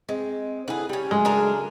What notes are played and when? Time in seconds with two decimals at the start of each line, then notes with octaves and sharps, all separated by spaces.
0.09 G#3 C4
0.68 D3 D#4 E4 G#4 B4
0.89 G3 C#4 G#5
1.11 C#3 F#3 G#3 A3
1.25 D4 G#4 A#4